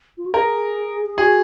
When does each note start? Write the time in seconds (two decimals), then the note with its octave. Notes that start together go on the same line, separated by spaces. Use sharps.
0.18 F4
0.26 F#4
0.34 G#4 A#4
1.06 G#4
1.18 F#4 G#4